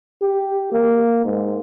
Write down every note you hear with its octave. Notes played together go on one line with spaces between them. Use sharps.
G4
A#3
G#2